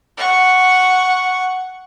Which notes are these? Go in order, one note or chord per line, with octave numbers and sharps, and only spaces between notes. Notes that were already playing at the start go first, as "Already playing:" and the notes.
F#5 C#6